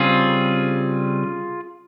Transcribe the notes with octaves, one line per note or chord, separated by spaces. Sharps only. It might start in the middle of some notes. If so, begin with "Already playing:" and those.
Already playing: C#3 G3 C4 F4 G#4